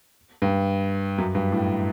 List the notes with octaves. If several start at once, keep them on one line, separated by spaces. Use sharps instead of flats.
G2
F#2
G2
A2